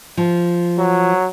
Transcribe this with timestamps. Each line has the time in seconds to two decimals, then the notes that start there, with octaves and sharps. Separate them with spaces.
0.17 F3
0.78 F#3